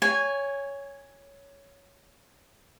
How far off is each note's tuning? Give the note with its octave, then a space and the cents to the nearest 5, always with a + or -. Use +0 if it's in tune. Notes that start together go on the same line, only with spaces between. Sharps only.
C#5 +10 G#5 -10